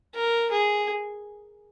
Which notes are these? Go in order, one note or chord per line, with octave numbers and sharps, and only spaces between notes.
A#4
G#4